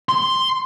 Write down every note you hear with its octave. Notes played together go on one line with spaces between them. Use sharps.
C6